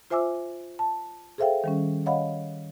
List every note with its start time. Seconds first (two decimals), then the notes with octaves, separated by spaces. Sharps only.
0.10 F4 C5 E5 G#5 D6 E6
0.79 A5
1.38 G#4 A4 C5 E5 F5 G5
1.64 D#3 G3 C#4
2.06 C#5 D#5 F5 F#5 B5